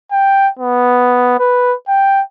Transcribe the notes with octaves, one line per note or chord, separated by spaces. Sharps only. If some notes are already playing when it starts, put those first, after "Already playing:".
G5
B3
B4
G5